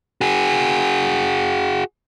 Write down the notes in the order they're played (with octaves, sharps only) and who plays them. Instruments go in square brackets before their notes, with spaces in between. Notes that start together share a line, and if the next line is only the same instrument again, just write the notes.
[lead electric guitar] F#4 G#4